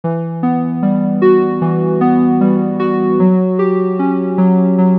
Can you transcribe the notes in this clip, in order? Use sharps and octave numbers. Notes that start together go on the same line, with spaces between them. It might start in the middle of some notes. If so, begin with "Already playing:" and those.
E3
B3
G3
F#4
E3
B3
G3
F#4
F#3
G4
C#4
F#3
F#3